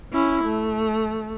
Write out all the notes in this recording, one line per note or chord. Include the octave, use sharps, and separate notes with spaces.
C#4 E4
A3